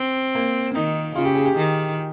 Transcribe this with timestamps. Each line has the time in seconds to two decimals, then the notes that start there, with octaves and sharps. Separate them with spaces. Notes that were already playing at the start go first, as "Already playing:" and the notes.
Already playing: C4
0.35 A#3
0.74 D#3 D#4
1.15 C#3 F4
1.25 G4
1.35 G#4
1.46 G4
1.56 D#3